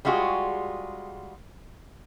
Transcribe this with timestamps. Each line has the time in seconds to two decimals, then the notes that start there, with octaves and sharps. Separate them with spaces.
0.05 G3 G#3 F4 F#4 G#4